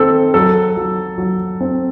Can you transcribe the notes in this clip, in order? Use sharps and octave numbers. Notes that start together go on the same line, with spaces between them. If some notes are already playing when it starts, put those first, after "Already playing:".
Already playing: D#3 C4 A4
F#3 A4
F#3
F#3
C4